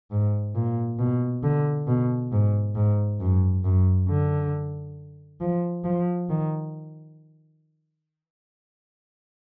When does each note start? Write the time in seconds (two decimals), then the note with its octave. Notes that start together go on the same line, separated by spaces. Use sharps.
0.11 G#2
0.55 A#2
0.99 B2
1.43 D3
1.88 B2
2.32 G#2
2.75 G#2
3.20 F#2
3.64 F#2
4.09 D3
5.40 F3
5.84 F3
6.29 D#3